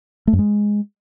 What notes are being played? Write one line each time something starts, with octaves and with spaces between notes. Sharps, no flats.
A3
F#2
G#3